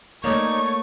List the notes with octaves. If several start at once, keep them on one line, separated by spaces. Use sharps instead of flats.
A3 A#3 D#4 C#5 D5 C#6